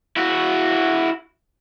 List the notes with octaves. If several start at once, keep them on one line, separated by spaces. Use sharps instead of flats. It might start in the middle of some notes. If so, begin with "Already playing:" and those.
E4 F#4